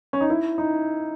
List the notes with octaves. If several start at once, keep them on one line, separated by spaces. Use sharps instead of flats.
C#4
D#4
E4
D#4